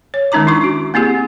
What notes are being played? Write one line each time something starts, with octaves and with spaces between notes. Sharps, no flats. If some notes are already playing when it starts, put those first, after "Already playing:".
C#5
D#3 G#3 C#4 D#4 A#5 D6
D4 E4 C#6 D6
F#4
A#3 C4 E4 G4 G#4